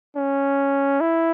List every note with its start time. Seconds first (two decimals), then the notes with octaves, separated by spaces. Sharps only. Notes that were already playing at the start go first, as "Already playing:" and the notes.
0.16 C#4
1.01 E4